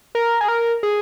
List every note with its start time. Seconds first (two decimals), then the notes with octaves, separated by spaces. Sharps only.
0.15 A#4
0.41 G#4
0.48 A#4
0.83 G#4